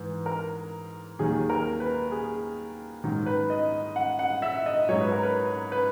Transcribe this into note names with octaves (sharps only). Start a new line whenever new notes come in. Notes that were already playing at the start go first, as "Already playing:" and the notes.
Already playing: G#2 E3
A#4
D#2 D#3 F#3 G#4
A#4
B4
G#4
G#2 D#3 F#3
B4
D#5
F#5
F#5
E5
D#5
G#2 F#3 C#5
B4
A#4
B4
B4